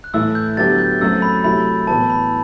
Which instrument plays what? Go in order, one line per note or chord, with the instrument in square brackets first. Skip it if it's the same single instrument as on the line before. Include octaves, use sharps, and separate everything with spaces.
[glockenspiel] F#6
[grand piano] A2 E3 A3 E4 [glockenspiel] E6
[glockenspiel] G6
[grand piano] D3 F#3 B3 E4 G4 [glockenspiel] A6
[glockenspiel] G6
[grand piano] F#2 F#3 A3 C4 F#4 [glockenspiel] E6
[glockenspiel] B5
[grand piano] C3 F#3 A3 E4 [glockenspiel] B5
[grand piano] A2 E3 B3 [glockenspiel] A5
[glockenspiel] B5